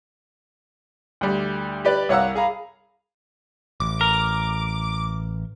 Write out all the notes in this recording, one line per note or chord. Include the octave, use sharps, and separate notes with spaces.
D2 G3
G4 B4 D5
C2 C#5 F5 F#5 A#5 E6
G#4 F5 A#5 B5
A1 D6
A#4